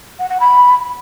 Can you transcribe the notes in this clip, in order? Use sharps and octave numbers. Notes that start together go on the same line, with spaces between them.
F#5
F#5
B5